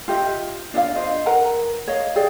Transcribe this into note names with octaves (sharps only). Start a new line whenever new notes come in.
F4 G4 D#5 E5
D4 F4 D#5 F5
D4 C5 D#5
A#4 B4 F#5 A#5
C#5 D#5 F5
G4 G#4 D5